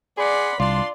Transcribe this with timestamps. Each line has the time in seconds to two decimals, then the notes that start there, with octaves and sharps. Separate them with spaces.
0.18 G#4 D5 F#5 B5 C6
0.60 C2 D4 F4 D5 C6